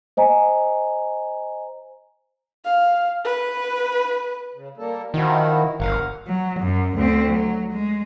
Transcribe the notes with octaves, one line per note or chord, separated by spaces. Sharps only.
C5 D#5 G#5 A#5
F5
B4
C#3
G3 A#3 A4
D#3 F3 E4 F#4
G1 A#4 F5 F#5
F#3
F#2
D2 C4
F#3
G#3